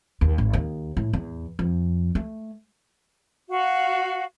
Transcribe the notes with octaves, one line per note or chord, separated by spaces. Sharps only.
D#2
G#1
D#2
A2
E2
F2
A3
F#4 F5